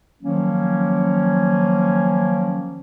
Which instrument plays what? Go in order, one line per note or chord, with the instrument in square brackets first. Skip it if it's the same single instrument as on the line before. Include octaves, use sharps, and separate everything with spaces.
[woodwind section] D#3 F3 F#3 A#3 C#4